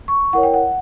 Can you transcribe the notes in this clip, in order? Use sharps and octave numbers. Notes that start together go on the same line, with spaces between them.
C#6
E4 A#4 C#5 F#5
G5
F#5